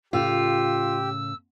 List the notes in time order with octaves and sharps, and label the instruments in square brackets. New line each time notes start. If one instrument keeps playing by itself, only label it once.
[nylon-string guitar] A2 C#3 [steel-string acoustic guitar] F4 [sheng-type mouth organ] G4 [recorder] E6